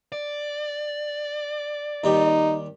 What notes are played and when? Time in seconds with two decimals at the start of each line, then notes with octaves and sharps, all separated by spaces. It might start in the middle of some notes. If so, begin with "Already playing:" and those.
0.12 D5
2.04 D#2 G3 D#4 G4